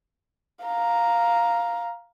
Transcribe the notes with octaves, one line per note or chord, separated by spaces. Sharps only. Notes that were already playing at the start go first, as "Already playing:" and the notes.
F5 A#5